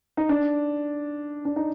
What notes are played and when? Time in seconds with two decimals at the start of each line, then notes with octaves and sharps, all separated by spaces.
0.17 D#4
0.29 D4
1.45 D4
1.56 D#4